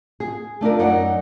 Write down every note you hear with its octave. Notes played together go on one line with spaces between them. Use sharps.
G#4
A3 D4 F4 A#4
F#2 D#4 D5 F#5